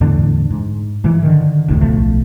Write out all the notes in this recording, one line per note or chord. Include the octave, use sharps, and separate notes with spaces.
E2 A2 D3 D4
G#2
G#2 E3
D3 D#3
F1 D2 A2
D1 B1 F3 A3